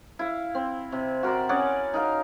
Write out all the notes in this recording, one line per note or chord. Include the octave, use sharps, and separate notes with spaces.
E4 F5
C4
C3
F#4 A#4 C5 D5
C#4 G#4 D5 F#5
D#4 A#4 F5